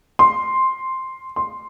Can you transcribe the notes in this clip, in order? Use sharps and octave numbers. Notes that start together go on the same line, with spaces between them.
C6
C6